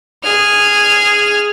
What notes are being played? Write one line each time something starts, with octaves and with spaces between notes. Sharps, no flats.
G#4 F6